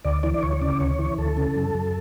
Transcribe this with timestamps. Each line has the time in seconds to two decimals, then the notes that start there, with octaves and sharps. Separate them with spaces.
0.05 D2 D5
0.23 E3 D5
0.34 D5
0.43 D2 C#5
0.61 C#3 D5
0.80 D2 C#5
0.99 E3
1.18 D2 A4
1.37 C#3
1.56 F#2
1.74 F#2